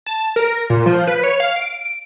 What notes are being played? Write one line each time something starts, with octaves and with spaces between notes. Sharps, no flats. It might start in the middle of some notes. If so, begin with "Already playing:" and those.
A5
A#4
A#2
F3
B4
C#5
F5
D7